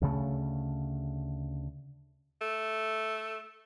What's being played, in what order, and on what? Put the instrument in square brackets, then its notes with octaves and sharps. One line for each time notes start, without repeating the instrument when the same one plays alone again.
[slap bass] D2 C#3 A3
[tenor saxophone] A3